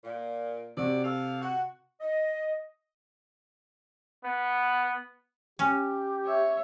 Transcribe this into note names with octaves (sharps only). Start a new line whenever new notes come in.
A#2
C3 F#4 D5
A4 F5
F#4
D#5
B3
C#4 G4
C#5 E5